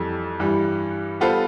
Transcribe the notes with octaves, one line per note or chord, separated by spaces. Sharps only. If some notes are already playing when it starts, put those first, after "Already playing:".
Already playing: F2 E3 G3 A4
G2 E3 G3
G3 B3 F4 A4 C5